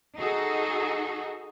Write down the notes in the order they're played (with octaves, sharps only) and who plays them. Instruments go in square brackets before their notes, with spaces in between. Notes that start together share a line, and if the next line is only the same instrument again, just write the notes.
[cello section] D#4 F#4 G#4 A4